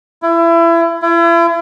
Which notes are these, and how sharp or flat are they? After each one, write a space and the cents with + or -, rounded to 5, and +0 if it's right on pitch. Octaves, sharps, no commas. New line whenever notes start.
E4 +30
E4 +40